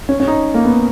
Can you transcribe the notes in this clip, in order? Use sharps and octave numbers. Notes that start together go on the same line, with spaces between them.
C#4
C#4
D#4
A#3
B3